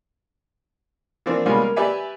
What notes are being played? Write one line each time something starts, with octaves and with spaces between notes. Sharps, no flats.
E3 F3 A#3 C4 D4
G3 G#3 A#3 B3 C#4 F4
A#4
G4 B4 D5 E5 G#5